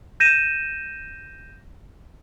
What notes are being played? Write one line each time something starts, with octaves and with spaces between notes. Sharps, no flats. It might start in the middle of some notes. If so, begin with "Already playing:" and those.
G6 A#6 D#7 E7